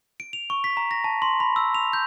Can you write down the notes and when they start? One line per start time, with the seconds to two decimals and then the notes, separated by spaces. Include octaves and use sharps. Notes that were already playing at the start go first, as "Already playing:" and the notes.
0.20 D7
0.33 F7
0.50 C#6
0.64 B6
0.77 A#5
0.91 A#6
1.04 A5
1.22 C6
1.40 B5
1.56 E6
1.75 F7
1.93 G6